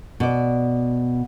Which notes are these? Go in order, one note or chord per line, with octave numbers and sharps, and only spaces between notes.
B2 D5